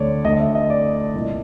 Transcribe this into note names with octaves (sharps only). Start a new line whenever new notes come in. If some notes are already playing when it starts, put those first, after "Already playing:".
Already playing: D2 D3 C#5 D5
D2 D3 D#5
E5
D#5
D5
C2 A#2